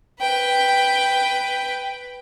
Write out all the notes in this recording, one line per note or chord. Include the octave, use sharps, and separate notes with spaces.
B4 G5